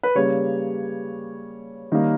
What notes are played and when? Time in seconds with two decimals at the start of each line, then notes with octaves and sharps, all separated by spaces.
0.03 B4
0.15 C#3 G3 A#3 C#5
1.92 D#3 G3 A#3